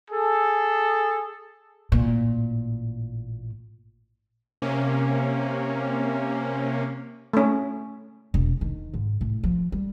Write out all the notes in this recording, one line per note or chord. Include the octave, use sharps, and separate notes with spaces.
G#4 A4
A1 A#2
C3 A#3 C#4
A3 C#4
E1
D#3
G#2
A2
F3
G3